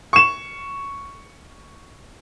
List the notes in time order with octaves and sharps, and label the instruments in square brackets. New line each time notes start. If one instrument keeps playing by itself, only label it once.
[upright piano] C#6 E7